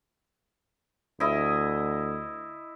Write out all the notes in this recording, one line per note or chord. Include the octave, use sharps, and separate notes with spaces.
D2 E4 D#5